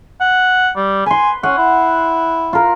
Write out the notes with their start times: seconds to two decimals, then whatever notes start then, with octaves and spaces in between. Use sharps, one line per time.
0.21 F#5
0.76 G3
1.06 B4 G#5 C6
1.43 C#4 F#5
1.58 E4
2.53 F4 A#4